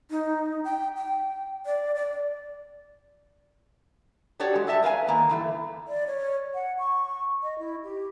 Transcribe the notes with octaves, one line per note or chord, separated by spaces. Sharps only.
D#4
G5
G5
D5
D5
D4 F#4 G4 A4 C#5 D5
G#3
A4 D5 E5 A5
A#4 B4 F5 G#5
D#3 A#3 B3
G2 E3 A3
D5
C#5
F#5
C#6
D#5
E4
G4